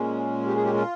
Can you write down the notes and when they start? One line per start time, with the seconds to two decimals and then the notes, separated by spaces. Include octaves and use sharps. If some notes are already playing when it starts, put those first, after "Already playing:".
Already playing: A#2 G#3 C#4
0.47 G4
0.56 G#4
0.65 G4
0.74 F4